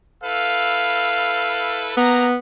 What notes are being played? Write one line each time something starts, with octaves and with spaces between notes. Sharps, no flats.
E4 A4 B4 F5
A#3 B3 A#5